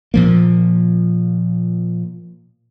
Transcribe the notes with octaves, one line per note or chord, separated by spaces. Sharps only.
A#2 F3 A#3